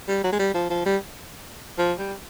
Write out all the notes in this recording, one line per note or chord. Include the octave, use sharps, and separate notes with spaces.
G3
F#3
G#3
G3
F3
F3
G3
F3
G3